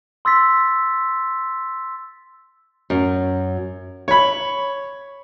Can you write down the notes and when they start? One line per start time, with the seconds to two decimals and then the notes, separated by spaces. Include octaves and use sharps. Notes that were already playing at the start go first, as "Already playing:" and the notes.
0.25 C6 E6 A6 B6
2.90 F#2
4.08 C#5 B5